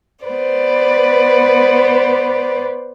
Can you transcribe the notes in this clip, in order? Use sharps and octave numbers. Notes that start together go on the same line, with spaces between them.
B3 B4 C5 D5